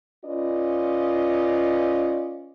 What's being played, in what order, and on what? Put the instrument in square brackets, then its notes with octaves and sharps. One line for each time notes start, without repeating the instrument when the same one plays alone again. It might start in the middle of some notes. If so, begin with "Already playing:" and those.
[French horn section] C#4 F4 B4 D5 D#5